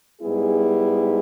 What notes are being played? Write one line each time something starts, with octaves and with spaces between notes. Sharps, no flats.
G#2 G3 B3 E4 G#4